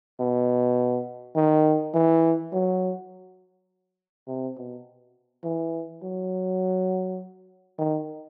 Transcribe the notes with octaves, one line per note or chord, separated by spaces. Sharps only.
B2
D#3
E3
F#3
C3
B2
E3
F#3
D#3